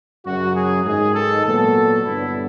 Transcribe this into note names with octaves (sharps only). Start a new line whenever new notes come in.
F#2 C#3 F#3 F#4
G#4
G#2 D#3 G#3 G#4
A4
A#2 F#3 B3 A4
G2 D3 G3 B3 E4